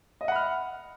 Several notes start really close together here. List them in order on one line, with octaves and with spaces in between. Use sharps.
D#5 E5 F#5 B5 F6